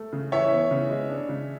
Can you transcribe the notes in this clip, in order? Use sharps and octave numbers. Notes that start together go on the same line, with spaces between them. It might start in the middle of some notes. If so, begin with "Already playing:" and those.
Already playing: A3
C#3
E3 C#5 E5
B3
C#3
G#3
D4
C#3